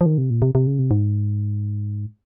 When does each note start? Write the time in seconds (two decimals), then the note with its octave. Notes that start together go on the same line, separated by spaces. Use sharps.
0.01 F3
0.06 D#3
0.18 C3
0.30 A#2
0.42 C3
0.55 C3
0.67 C#3
0.79 C3
0.91 G#2